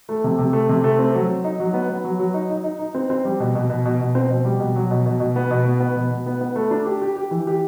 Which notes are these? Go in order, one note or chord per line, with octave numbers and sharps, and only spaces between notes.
A3
C3
C3
A3
C3
A3
C4
F#3
F#3
D#4
F#3
B3
B3
F#3
F#3
D#4
D#4
D#4
D#4
C4
C4
G3
B2
B2
B2
B2
B2
C4
B2
G3
B2
F#3
B2
B2
B2
B3
B2
B3
B3
B2
B2
B3
B3
A3
D4
G4
G4
G4
E3
G4